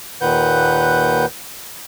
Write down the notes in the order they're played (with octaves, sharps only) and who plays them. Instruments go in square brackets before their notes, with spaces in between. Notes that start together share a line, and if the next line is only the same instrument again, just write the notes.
[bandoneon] D#2 A#2 D#3 B4 F#5 G6